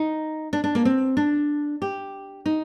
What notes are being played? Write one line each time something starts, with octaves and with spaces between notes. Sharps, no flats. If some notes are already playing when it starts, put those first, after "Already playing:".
Already playing: D#4
D4
D4
A#3
C4
D4
G4
D#4